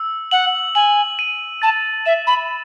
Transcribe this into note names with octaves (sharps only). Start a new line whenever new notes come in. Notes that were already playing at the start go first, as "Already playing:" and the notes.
Already playing: E6
F#5 F#7
G#5 F#7
D#7
A5 A6
E5 E7
B5